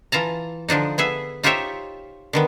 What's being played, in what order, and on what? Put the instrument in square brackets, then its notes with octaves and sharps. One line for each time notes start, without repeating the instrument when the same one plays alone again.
[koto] E3 F4 A5 A#5
D3 F3 D4 D#4
B3 G#4 E5
D#4 F4 G4 C5 C#5 E5
D3 D#3 B3